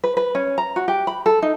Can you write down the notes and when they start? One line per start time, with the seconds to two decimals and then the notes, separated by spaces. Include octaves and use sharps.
0.04 B4
0.17 B4
0.35 C#4
0.58 A#5
0.76 F#4
0.88 G4
1.07 B5
1.26 A4
1.42 D#4